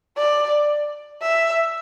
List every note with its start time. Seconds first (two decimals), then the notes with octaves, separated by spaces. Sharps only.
0.18 D5
1.22 E5